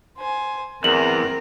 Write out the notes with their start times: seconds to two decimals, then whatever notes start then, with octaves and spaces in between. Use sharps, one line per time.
0.17 C5 G#5
0.84 E2 C4 A#4 F#7